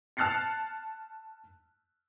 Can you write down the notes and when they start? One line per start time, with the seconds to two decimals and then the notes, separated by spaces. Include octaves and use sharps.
0.17 A5 F6 F#6 A6 C7 C#7